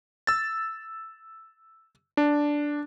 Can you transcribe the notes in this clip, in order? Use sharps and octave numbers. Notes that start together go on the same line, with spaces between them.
E6 A6
D4